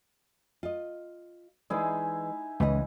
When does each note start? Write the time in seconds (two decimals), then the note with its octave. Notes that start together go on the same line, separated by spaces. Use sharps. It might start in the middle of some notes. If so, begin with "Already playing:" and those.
0.63 F4 D#5
1.70 E3 G#3 D#4 E4 G#4 D5
2.60 C#2 E3 B4 D#5